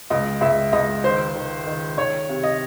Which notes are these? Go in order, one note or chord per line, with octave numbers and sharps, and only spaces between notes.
C#2 D#5
C#2 E5
C#2 D#5
D#3 C5
D#3
D#3
D#3 C#5
C3
D#5